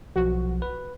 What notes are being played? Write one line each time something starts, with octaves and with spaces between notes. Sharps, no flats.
B1 F3 F#4
B4